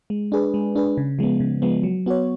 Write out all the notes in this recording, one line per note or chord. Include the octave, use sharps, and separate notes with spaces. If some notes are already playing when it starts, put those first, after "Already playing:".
G#3
D4 G#4 B4
G#3
D4 G#4 B4
C#3
F3 G#3 B3
C#3
F3 G#3 B3
F#3
B3 F#4 C#5